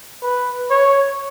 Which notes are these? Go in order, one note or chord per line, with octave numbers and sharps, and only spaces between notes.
B4
C#5